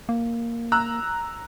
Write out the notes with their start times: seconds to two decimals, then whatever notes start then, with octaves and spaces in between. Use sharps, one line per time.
0.09 A#3
0.72 A#5 E6 F#6